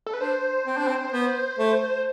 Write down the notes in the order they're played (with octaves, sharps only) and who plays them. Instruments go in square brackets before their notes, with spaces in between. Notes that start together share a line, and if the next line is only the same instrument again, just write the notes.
[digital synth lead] A4
B4
[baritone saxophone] D4 [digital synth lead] C5
[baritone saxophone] C4
D4
C4
B3
A3